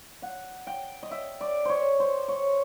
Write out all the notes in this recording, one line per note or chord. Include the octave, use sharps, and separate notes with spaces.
F#5
G5
D#5
E5
D5
C5 C#5
C5
C#5